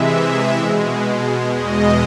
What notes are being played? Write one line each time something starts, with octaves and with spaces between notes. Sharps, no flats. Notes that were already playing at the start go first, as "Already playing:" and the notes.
Already playing: C3 E3 G#3 E5
B2 G#3
E2 B2 G#3 D#5